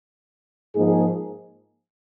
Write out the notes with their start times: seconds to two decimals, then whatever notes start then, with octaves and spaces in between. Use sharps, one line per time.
0.76 G#2 F3 A#3 D#4 G#4